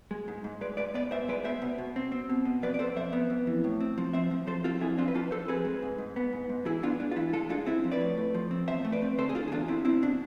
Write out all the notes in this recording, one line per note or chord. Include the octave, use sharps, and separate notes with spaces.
G#3
G#2
G#2
G#3 B4 D5
G#2 B4 D5
B3 B4 D5
G#2 C5 E5
G#3 B4 D5
B3 C5 E5
B2
B2
C4
C4
B2
B2
F2 B4 D5
D5
F2 A4 C5
F2 C5 E5
B3
F2
E3
A2
C4
F3
C4 C5 E5
F3
F3 A4 C5
C4 F4 A4
F2 E4 G#4
C4 D4 F4
B4
F2 F4 A4
F2 A4 C5
C4 G#4 B4
G#3
G#2
G#2
B3
G#2
G#2
E3 E4 G#4
B3 D4 F4
G#3 D4
F4
E3 E4
G#3 F4 A4
G#3 D4 F4
C4 E4
F3
B4 D5
A2
A3
F3
C4
E2 C5 E5
A3
B4 D5
C4
D3 A4 C5
G#4
D3 F4 A4
G#4
E2 D4 F4
C4 E4
C4 E4
B2 D4